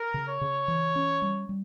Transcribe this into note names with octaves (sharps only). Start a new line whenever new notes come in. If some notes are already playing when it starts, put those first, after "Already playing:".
Already playing: A#4
C#3
C#5
C#3
E3
C#4
G3
G3